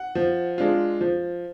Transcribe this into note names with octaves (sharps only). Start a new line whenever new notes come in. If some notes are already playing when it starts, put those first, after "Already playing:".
Already playing: F#5
F3
G#3 D4 F4
F3